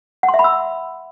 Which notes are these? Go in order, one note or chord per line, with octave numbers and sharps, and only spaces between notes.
F#5
C6
E5
B5
E6